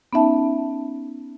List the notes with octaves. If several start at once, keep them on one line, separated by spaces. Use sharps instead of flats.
B3 C#4 D#4 E5 A5